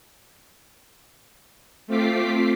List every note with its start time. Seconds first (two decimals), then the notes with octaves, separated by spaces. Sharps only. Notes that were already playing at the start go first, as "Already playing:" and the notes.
1.87 A3 C4 F4 D6 B6 C7